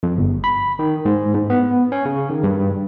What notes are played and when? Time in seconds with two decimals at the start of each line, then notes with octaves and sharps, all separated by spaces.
0.03 F2
0.17 G1
0.44 B5
0.79 D#3
1.05 G#2
1.34 G#2
1.50 B3
1.92 C#4
2.05 C#3
2.30 D#3
2.43 G2